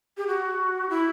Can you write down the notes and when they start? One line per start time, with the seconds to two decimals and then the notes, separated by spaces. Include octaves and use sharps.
0.17 G4
0.27 F#4
0.90 E4